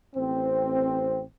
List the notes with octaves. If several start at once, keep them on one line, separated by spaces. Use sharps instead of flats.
A1 C4